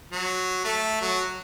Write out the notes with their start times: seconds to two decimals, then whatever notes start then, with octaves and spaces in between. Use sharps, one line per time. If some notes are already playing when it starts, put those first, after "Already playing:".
0.11 F#3
0.65 A3
1.01 F#3